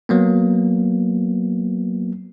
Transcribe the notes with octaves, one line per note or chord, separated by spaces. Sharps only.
F#3 A#3 B3